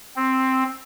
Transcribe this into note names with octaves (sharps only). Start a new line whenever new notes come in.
C4